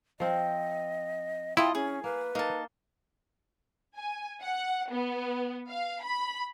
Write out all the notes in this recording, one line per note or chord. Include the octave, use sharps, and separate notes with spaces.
F3 C4 D#5
E4 F4 D#5 G5 A5
C#4 G#4
A#3 B4
A#3 D#4 A5
G#5
F#5
B3
F5
B5